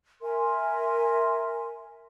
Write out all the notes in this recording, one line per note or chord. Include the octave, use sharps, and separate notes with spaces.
A#4 E5 G#5 C6